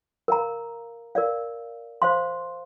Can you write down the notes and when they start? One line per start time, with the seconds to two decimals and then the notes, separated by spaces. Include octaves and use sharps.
0.28 A#4 F5 A#5
1.15 A#4 D5 F5
2.02 C5 F5 C6